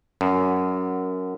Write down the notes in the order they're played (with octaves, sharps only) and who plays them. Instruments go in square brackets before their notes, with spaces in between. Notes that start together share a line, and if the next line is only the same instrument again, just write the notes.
[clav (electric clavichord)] F#2